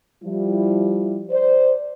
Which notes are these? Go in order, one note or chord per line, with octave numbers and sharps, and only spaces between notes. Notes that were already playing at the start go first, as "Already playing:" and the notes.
F3 G3 E4
C5 D5